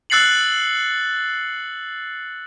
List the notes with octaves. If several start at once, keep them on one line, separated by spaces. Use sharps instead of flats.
E6 F#6 A6 C7 C#7 F#7